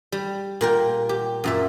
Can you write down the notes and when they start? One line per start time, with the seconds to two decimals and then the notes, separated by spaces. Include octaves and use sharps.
0.12 G3
0.61 A#2 A#4 G5
1.09 G4
1.44 F#2 A#2 E5